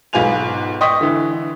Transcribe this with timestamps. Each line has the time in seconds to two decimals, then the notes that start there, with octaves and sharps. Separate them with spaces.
0.13 B1 G#2 B3 F4 G#5 F7
0.81 D#5 G5 C#6 D#6 B6
1.01 D3 E3